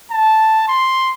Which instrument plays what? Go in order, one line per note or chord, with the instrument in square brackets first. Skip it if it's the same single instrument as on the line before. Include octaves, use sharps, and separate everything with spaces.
[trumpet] A5
C6